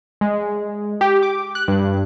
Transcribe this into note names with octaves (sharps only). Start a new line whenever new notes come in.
G#3
G4
D6
F#6
G2